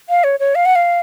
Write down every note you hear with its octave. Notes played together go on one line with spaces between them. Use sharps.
F5
C#5
C#5
F5
F#5
F5